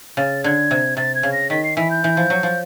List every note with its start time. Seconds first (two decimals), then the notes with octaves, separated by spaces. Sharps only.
0.17 C#3 A6
0.44 D3 G#6
0.71 C3
0.97 C3 A6
1.15 G#6
1.23 C#3
1.33 A#6
1.50 D#3 B6
1.64 C7
1.77 E3 B6
1.91 G6
2.04 E3
2.17 F3
2.30 F#3
2.43 F3